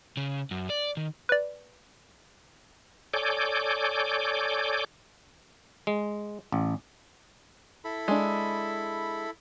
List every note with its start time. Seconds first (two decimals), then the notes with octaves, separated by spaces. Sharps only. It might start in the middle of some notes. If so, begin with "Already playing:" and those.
0.17 C#3
0.51 F#2
0.70 D5
0.97 D#3
1.29 B4 D5
3.14 A4 C#5 D5 G#5 D6 G6
5.87 G#3
6.52 A1
7.84 E4 A4 B5
8.08 G#3 D4